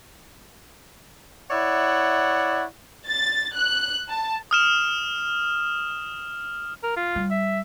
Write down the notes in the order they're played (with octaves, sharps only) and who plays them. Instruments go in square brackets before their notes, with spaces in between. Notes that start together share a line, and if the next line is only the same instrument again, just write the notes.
[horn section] E4 C#5 D5 E5 F#5
[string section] A6
F#6
A5
[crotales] D#6 F6 E7
[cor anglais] A#4
F4
[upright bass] G3
[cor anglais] E5